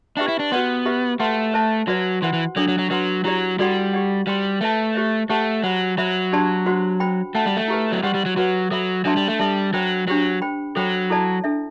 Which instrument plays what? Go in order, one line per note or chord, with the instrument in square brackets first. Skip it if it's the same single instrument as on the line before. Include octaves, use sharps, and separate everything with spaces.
[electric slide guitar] D4 [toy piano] G4 B4 E5 G5 B5
[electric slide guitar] E4
D4
[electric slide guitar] B3 [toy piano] F#4 B4 D5 F#5 C6
[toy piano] G4 B4 E5 B5
[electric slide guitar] A3 [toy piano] B4 F#5 A5 C6
[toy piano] C5 E5 A5
[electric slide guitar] F#3 [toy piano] F#4 B4 D5
[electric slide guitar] E3 [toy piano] C5 F#5 C6
[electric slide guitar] E3
[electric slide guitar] F#3 [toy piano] D4 A4 D5
[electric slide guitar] F#3
F#3
[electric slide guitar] F#3 [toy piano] B4 F#5 C6
[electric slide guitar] F#3 [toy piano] E4 G4 D5
[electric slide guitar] G3 [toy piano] F#4 A4 D5 F#5 C6
[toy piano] G4 D5 F#5
[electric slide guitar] G3 [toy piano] C5 G5 C6
[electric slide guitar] A3 [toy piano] B4 E5 A5
[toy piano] G4 C5 E5
[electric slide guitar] A3 [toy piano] G4 C5 F#5 A5
[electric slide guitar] F#3 [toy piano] C5 F#5 B5
[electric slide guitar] F#3 [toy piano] C5 E5 B5
[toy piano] D4 G4 D5 A5 C6
F#4 C5 F#5 C6
C5 G5 B5
[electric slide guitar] A3 [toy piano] C5 F#5 A5
[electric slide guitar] G3
A3
[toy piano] E4 G4 B4
[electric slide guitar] F#3
[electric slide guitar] G3 [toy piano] G4 C5 F#5 C6
[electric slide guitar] G3
F#3
[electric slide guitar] F#3 [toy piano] F#4 B4 F#5
[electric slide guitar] F#3 [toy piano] A4 E5 B5
[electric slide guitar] F#3 [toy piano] D4 A4 E5 A5 C6
[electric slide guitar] G3
A3
[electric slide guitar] G3 [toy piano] A4 E5 A5
[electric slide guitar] F#3 [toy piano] C5 G5 B5
[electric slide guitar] F#3 [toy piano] D4 G4 C5
[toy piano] C5 G5 B5
[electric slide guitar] F#3 [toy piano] A4 C5 G5 B5
[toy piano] E4 A4 D5 A5
D4 A4 E5